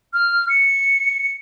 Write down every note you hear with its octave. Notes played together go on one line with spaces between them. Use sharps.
F6
C#7